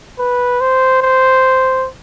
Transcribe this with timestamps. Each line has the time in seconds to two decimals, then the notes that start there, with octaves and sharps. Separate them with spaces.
0.19 B4
0.61 C5
1.02 C5